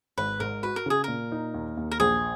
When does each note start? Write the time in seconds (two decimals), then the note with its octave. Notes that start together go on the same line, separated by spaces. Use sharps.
0.18 G#1 B4
0.40 G#2 A#4
0.63 F#4 B4
0.76 A#4
0.86 C#3 G#4
1.04 A#2 A#4
1.32 D#4
1.54 D#2
1.77 D#2
1.92 A#4
2.00 A#1 G#4